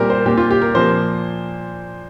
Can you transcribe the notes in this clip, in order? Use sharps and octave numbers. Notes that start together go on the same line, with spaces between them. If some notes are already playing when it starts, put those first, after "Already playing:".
Already playing: A#2 G3 C4 G4 A#4
C5
A#2 A#3 G4
F4
G4
A#4
A#2 F3 A#3 C5